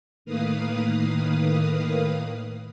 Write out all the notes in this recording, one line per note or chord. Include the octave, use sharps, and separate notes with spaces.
A2 D#3 A#3 B4 F5 D#6